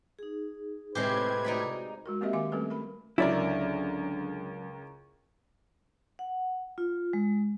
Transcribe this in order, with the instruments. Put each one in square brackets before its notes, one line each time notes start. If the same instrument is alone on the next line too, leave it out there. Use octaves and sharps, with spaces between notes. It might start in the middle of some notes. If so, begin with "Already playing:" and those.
[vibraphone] D#4 G#4
[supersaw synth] A2 C3 G#6 [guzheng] G#3 C4 G4 [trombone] B4
[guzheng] D#4 D5 B5 [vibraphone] F#4
[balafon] G#3 F#4 A#4
A#3 C4 G4 A#4 D#5 E5
D#3 F5 G#5 D6
G3 A3 C4 C#4 A4 B4
A#4 B5
[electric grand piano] C#2 A#4 [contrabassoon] D3 [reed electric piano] F#3 C#4 [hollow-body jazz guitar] E4 D5
[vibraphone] F#5
F4
G#3